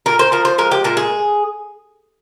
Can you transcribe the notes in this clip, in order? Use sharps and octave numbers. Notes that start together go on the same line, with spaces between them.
A#2 A#4
C5
F3 A#4
C5
G#3 A#4
G4
A#2 A#4
G#4